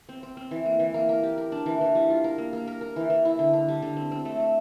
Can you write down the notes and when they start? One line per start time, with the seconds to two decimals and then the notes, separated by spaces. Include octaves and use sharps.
0.09 C4
0.23 C4
0.37 C4
0.51 E3
0.66 A#3
0.80 E3
0.94 A#3
1.09 A#4
1.23 G4
1.38 A#4
1.52 D4
1.66 E3
1.81 E3
1.95 G3
2.10 F4
2.24 A#4
2.38 A#3
2.53 A#3
2.67 A#4
2.81 A#4
2.96 E3
3.10 E3
3.25 E4
3.39 D3
3.53 D3
3.68 G3
3.82 D3
3.96 C4
4.11 C4
4.25 A3
4.40 A3